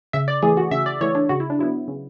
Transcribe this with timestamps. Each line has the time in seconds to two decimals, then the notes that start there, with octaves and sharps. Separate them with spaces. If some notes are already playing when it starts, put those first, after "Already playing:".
0.13 C#3 E5
0.28 D5
0.43 E3 A3 G#4
0.57 F#4
0.71 C#3 E5
0.86 D5
1.01 E3 A3 C#5
1.15 D4
1.29 C#3 F#4
1.40 E4
1.50 D4
1.59 F#3 B3 E4
1.88 C#3